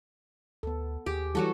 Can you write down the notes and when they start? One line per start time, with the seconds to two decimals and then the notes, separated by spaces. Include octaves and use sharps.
0.63 D2 B3 A4
1.06 D#2 G4 G#4
1.35 E3 F#3 G3 F#4 A4